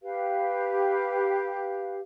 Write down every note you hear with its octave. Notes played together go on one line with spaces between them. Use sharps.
G4 B4 F5